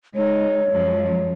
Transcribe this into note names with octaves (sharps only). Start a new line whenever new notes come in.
G#3 D#4 C#5
F#2 F3 G#3